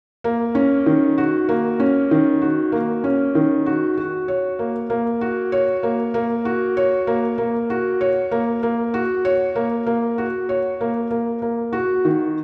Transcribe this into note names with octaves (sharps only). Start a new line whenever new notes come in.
A#3
C#4
D#3
F#4
A#3
C#4
D#3
F#4
A#3
C#4
D#3
F#4
F#4
C#5
A#3
A#3
F#4
C#5
A#3
A#3
F#4
C#5
A#3
A#3
F#4
C#5
A#3
A#3
F#4
C#5
A#3
A#3
F#4
C#5
A#3
A#3
A#3
F#4
D#3